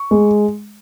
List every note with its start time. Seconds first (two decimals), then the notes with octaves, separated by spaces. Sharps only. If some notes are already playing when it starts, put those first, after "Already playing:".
Already playing: C#6
0.11 G#3